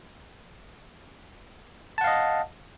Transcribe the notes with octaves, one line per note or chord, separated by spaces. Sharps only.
D#5 F5 F#5 A5